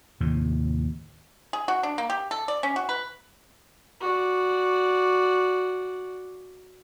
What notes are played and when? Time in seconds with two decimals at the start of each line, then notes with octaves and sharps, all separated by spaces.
0.20 D#2 A2 C3
1.53 G#4
1.68 F#4
1.83 D4
1.98 A#3
2.10 G4
2.31 A4
2.48 D5
2.63 C#4
2.76 F#4
2.89 B4
4.01 F#4 D5